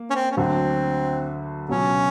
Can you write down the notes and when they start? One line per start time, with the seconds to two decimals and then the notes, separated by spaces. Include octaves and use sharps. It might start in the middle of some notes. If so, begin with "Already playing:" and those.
Already playing: A#3
0.10 C#4
0.15 C4
0.31 C#4
0.37 D2 D3 F#3 C4
1.69 C#2 B2 F#3 C#4